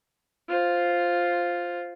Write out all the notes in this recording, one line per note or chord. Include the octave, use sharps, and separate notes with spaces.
F4 C5